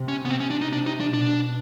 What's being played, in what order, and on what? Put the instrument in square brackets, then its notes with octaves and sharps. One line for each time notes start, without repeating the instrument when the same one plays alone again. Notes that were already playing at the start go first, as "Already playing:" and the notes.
Already playing: [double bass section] C3
[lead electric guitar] C#4
B3
[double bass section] C3 [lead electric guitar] C4
[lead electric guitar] C#4
D4
D#4
[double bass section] C3 [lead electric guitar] D4
[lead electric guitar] D#4
D4
[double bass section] B2 [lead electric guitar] D4